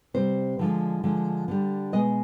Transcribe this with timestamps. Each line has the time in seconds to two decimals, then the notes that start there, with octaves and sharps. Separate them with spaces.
0.14 C3 G3 C5
0.59 D3 F3 G#3
1.04 D3 F3 G#3
1.48 D3 G3
1.92 B2 G#3 D#5